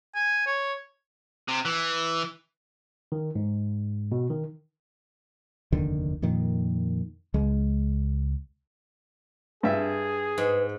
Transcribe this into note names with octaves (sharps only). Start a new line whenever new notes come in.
G#5
C#5
C3
E3
D#3
G#2
B2
D#3
F1 D#2 D3 D#3
F2 A#2 D#3
C#2 G#3
G2 G#4 E5
G#2 B4